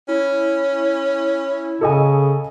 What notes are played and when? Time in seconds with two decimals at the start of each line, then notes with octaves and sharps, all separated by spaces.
0.09 C#4 E4
1.81 C#3 A4 D#5 G#5